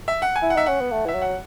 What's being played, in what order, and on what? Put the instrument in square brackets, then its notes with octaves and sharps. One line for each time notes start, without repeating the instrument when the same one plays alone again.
[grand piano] E5
F#5
G#5
[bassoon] E4
[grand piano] F#5
[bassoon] D#4 [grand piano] E5
[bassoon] C#4 [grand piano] F#5
[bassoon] B3
A3
E3
[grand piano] E5
[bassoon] F#3
[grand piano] F#5